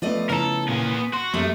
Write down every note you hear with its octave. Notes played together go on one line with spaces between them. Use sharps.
F3 A3 B3 F4 D5 D#5
C#3 E4 A4 A#4 A#5
A#2 A#3 B3 G#4
F#4 C6
F#2 G3 A3 A#3 G#4